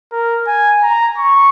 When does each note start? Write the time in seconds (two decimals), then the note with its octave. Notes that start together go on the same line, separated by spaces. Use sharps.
0.12 A#4
0.47 G#5
0.83 A#5
1.18 C#6